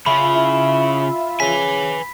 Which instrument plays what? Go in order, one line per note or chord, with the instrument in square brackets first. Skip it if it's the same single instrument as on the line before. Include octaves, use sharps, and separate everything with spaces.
[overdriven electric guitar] C#3 C#4 [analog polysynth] F4 E5 [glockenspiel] B5
[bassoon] E4
[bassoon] C#3 [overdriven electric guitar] B4 G#5 [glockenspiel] B6